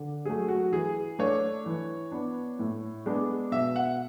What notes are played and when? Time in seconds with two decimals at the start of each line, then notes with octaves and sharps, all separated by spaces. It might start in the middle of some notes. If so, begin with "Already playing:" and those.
Already playing: D3
0.25 F#3 A3 G#4
0.48 F#4
0.72 E3 G#4
1.19 A3 D4 C#5
1.66 E3
2.12 B3 D4
2.59 A2
3.06 G#3 B3 D4
3.52 B2 E5
3.76 F#5